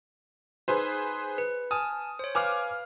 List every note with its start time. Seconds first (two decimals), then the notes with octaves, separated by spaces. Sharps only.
0.68 D#4 G#4 B4 C5
1.38 B4
1.71 G#5 A5 D#6 F6
2.19 C5 C#5
2.35 B4 F5 G#5 D6 F6